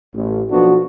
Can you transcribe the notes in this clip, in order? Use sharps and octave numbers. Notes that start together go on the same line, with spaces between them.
A1
B1 F3 B3 D4 F#4